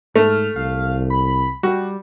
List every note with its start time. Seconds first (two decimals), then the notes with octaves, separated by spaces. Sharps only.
0.16 G#2 A3 F6
0.56 C2 F5
1.10 B5
1.63 G3 F#4